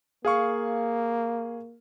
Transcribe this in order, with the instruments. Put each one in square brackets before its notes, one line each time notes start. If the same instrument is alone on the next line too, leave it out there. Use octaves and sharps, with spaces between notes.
[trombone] A#3 [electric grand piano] G#4 F5 C#6